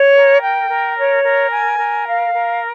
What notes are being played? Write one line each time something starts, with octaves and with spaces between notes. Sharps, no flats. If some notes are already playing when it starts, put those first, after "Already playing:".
Already playing: C#5
A#4
G5
A#4
C#5
A#4
G#5
A#4
F5
A#4